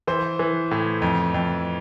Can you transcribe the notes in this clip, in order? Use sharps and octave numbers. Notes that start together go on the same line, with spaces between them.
E3 C5
E3
A2
F2
F2